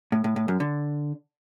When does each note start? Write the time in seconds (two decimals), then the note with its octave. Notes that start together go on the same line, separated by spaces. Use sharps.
0.12 A2
0.24 A2
0.36 A2
0.48 F#2
0.60 D3